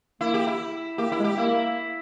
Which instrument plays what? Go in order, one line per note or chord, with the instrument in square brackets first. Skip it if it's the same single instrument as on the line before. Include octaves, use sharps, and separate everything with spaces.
[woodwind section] A#3 [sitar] E4
[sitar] G4
E4
[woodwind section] A#3 [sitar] G4
[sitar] E4
[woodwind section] G#3
[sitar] G4
[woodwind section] A#3 [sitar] E4